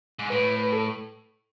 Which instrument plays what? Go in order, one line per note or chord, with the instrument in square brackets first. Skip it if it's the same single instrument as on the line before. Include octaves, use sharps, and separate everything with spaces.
[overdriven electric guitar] G#2
[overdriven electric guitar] A2 [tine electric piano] B4
[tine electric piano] B4
A4